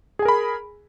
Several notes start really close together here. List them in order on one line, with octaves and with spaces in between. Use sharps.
G#4 G#5 A#4 B5